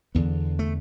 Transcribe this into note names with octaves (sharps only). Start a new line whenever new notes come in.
E2 D3 B3
A3